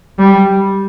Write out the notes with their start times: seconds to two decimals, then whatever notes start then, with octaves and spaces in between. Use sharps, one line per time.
0.18 G3